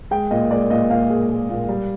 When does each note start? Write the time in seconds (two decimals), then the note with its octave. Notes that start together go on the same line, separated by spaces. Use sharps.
0.11 G#3 G5
0.31 A#2 D#5
0.51 G#3 D5
0.70 A#2 D#5
0.90 A#2 F5
1.10 G#3
1.30 G#3
1.49 A#2
1.69 G3